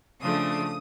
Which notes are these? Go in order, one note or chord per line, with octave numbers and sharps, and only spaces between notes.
C#3 F3 A3 D4 D#6